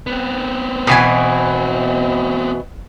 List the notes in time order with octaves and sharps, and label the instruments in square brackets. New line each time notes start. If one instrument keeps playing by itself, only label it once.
[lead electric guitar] B3 C4
[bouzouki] B2 E3 G#5